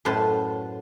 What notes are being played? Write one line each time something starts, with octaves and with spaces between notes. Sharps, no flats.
F#2 A2 B4 C5 A5